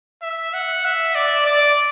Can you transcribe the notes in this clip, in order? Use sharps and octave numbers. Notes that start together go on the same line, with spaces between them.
E5
F#5
E5
D5
D5